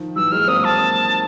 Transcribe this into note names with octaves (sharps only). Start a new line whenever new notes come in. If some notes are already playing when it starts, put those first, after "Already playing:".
Already playing: D#3 F3
E3 F#3 E6
F#3 G#3 F6
A#3 C4 D#6
A5